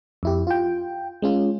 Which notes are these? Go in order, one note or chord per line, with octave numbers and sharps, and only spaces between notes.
F2 E4 G4
F4 G5
G#3 C#4 F4